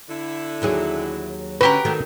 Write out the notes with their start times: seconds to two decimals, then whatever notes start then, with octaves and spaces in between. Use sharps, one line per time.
0.09 D3 E4
0.62 D#2 F#3 G#4
1.61 D3 C#4 F#4 G4 A#4 B4
1.85 D#3 F#3 A3